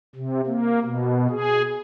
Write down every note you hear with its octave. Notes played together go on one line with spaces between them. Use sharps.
C3
A#3
B2
G#4